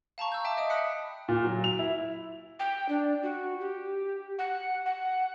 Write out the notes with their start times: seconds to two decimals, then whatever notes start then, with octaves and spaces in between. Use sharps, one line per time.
0.18 F5 A5 A#5 C#6
0.32 E6 G6
0.44 E5 G5 A5 D6
0.57 D#5 E5 G5 D#6
0.70 B5 D#6 F#6 B6 C#7
1.28 A#2
1.44 F#3
1.64 F7
1.79 E4
2.60 G5
2.89 D4
3.23 F#4
3.60 G4
4.39 F#5
4.86 F#5